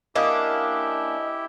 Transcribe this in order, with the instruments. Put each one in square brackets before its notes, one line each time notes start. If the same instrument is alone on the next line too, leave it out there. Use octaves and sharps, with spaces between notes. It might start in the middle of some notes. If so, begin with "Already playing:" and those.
[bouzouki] A#3 C#4 D4 [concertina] E4 G4 [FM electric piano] D#5 D#6